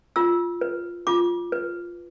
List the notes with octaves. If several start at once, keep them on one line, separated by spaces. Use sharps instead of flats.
F4 E6
B4
F4 D6
B4